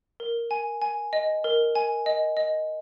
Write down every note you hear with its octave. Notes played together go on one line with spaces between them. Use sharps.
A#4
G#5
G#5
D#5
A#4
G#5
D#5
D#5